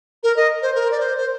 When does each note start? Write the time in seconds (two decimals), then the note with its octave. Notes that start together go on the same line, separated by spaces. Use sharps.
0.23 A#4
0.37 D#5
0.62 C5
0.75 A#4
0.91 D5
1.00 C5
1.18 C5